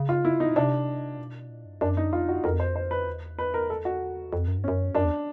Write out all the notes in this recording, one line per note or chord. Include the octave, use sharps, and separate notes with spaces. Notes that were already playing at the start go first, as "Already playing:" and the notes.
Already playing: C#3
F4
E4
D#4
B2
C3 D4
B2
A#2
G2
F#2 D4
D#4
F2 F4
F#4
F2 A#4
C5
C5
B4
E2
B4
A#4
A4
F#4
F2
F#2
G2
F#2 C#4
F#2 D4
E2